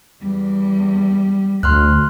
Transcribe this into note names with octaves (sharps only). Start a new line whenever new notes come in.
E2 G3
D2 A3 C6 F6 F#6